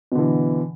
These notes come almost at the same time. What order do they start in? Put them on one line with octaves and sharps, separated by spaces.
B2 D3 E3